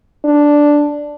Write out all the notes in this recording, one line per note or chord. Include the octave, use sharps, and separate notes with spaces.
D4